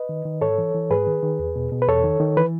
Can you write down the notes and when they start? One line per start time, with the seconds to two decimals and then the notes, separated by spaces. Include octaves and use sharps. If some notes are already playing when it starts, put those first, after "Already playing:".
Already playing: B4 D#5
0.09 D#3
0.25 D#3
0.41 G#2 A4 C#5
0.58 E3
0.74 E3
0.90 G#2 G#4 B4
1.07 D#3
1.23 D#3
1.39 E2
1.56 B2
1.72 B2
1.82 B4
1.88 E2 A4 C#5
2.04 D#3
2.20 D#3
2.37 E3 B4